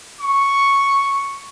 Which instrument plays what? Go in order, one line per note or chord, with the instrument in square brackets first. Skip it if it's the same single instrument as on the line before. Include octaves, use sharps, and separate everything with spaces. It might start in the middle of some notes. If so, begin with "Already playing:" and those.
[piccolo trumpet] C#6